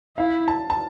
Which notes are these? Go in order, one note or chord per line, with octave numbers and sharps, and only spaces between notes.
E4 F5
A5
A5